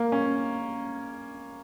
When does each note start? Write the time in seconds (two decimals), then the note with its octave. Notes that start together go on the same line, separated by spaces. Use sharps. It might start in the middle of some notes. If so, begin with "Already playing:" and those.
Already playing: A#3
0.12 C#4